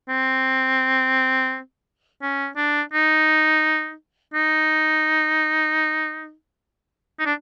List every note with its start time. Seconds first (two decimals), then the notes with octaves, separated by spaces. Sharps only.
0.09 C4
2.22 C#4
2.57 D4
2.93 D#4
4.34 D#4
7.19 D#4
7.26 D4